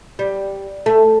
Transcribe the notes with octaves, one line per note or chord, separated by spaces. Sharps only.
G3
A3